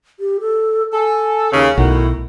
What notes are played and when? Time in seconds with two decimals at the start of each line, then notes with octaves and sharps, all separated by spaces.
0.20 G4
0.41 A4
0.93 A4 G#5
1.52 D#2 C#3
1.77 B1 A2 D#3 E4 F#4